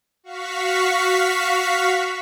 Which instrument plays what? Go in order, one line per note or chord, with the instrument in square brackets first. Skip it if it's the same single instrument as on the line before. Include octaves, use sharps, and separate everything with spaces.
[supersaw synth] F#4 F5 C#6 B6